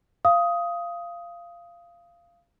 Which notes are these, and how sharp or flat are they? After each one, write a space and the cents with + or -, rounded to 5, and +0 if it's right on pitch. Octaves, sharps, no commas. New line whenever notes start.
F5 -15 D#6 +10